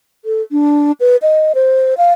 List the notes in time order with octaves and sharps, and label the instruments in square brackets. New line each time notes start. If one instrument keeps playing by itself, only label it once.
[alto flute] A4
D4
B4
D#5
C5
F5